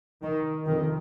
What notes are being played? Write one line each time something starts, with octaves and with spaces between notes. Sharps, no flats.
D#3
F2 C3 D#3